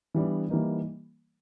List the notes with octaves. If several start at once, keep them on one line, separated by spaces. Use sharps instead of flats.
E3 G3 B3 D4
E3 G3 A#3 D#4